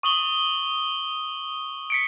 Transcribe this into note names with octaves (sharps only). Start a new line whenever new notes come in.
C#6 D#6 F#7 G7
B6 C#7 D7